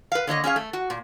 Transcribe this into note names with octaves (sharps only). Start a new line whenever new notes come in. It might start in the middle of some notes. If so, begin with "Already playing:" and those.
B4 F5
D3 A#3 C#5 D#5
C#4 G#4 C#5 F5
A3
F#4
A#2